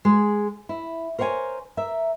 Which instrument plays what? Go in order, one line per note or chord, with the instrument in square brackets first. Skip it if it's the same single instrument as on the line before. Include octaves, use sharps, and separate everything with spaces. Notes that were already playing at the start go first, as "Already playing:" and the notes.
[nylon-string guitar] G#3 G#4
E4
A#4 C5 C#5 F5 G#5
A#4 E5